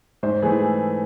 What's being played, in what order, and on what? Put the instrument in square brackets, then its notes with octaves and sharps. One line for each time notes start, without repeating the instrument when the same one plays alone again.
[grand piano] G#2 C5
E3 G#4
A3